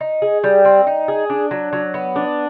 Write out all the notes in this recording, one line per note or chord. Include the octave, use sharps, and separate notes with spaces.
D#4
G#4
G3
C4
D#4
G#4
D4
F#3
F#3
B3
D4